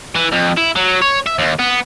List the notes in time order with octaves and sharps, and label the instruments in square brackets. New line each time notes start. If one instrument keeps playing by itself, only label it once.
[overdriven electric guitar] E3
F2
E4
F#3
C#5
E5
D#2
B3